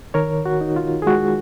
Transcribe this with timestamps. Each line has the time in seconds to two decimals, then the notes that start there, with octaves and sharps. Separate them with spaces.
0.14 D#3 A#4 C#5
0.46 F#4
0.61 D#4
0.76 F4
1.02 G#4
1.07 G#3 F#4